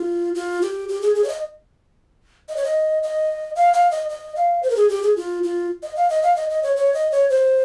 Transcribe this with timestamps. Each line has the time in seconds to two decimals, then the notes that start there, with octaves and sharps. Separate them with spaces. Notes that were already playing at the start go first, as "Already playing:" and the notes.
Already playing: F4
0.35 F4
0.62 G4
0.89 G4
1.02 G#4
1.15 G#4
1.24 C#5
1.29 D#5
2.49 D#5
2.56 C#5
2.64 D#5
3.03 D#5
3.56 F5
3.74 F5
3.91 D#5
4.09 D#5
4.36 F5
4.63 C5
4.70 A#4
4.77 G#4
4.89 G4
5.03 G#4
5.16 F4
5.43 F4
5.83 D#5
5.96 F5
6.10 D#5
6.23 F5
6.36 D#5
6.50 D#5
6.63 C#5
6.76 C#5
6.94 D#5
7.12 C#5
7.30 C5